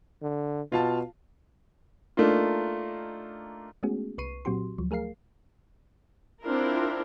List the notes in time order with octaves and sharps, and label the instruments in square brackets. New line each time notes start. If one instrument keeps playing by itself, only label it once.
[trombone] D3
[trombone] B2 [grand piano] F4 F5 A5
[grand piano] A3 A#3 D4 D#4 F4
[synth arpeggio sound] G#3 A3 B3 C#4 F#4 G#4
C2 B4 C#6 C7 D#7
A#2 F#3 C4 F#4 G4 C6
D2 F3 F#3
A3 G#4 A#4 F5 C7
[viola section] C4 D4 E4 F4 A#4